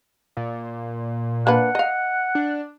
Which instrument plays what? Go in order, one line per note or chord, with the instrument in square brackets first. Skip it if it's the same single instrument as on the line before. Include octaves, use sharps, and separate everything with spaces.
[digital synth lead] A#2
[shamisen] A#3 D4 B4 [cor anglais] F#5
[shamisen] D#5 F5
[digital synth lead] D4